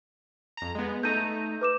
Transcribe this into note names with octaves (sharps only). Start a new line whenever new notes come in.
F2 A#5
G#3 B3
A3 D#4 A#5 G6 D#7
B4 D6 E7